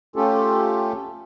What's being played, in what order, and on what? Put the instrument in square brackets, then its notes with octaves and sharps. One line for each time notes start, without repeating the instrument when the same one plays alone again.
[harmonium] A3 C#4 F4 G4 A4